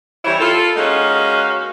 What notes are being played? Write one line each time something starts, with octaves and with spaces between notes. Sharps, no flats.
E3 G3 C4 E4 C#5
F4 A4
G#3 A#3 C#4 D#4 F#4 F5